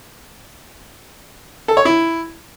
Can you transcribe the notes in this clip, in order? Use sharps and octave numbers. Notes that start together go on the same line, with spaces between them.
A4
C#5
E4